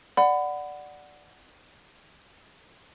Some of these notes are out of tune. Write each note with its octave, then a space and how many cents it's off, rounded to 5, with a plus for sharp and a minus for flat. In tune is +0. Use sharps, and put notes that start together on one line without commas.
D5 +0 F#5 +0 B5 +25